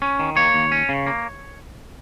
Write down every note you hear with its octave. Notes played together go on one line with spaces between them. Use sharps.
C#4
D#3
A#3 C#5
D#2
C#4
C#3
A#3